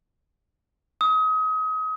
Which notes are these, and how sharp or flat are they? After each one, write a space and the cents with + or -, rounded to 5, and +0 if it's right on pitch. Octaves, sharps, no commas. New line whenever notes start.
D#6 +30